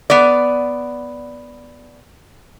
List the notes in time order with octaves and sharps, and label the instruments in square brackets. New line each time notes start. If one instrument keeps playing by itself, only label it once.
[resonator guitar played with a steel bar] B3 D5